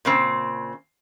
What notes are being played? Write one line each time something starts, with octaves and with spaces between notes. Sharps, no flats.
A#2 C#3 C4